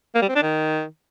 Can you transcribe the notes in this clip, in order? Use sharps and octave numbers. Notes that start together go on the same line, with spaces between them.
A#3
G3
C4
D4
D#3